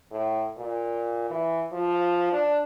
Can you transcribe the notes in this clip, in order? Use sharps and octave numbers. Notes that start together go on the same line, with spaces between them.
A2
A#2
E3
F3
D4